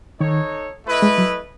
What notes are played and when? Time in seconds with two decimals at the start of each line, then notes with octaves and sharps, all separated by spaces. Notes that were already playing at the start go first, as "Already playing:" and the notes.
0.20 D#3 D#4 A4 C#5
0.85 A3 E4 B4 D#5
1.02 G#3
1.18 F#3